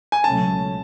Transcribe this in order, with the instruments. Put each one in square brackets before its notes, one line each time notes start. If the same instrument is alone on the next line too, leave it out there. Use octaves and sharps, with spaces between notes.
[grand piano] G#5
[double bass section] C#2 B2 F#3 A3 C#4 [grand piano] A5